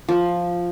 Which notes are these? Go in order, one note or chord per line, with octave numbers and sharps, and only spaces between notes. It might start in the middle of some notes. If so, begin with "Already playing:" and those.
F3